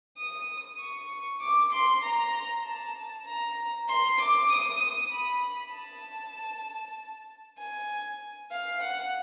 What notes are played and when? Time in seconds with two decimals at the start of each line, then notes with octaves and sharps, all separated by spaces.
0.18 D#6
0.80 C#6
1.41 D6
1.72 C6
2.03 A#5
2.65 A5
3.26 A#5
3.88 C6
4.19 D6
4.50 D#6
5.12 B5
5.73 A5
7.58 G#5
8.51 F5
8.81 F#5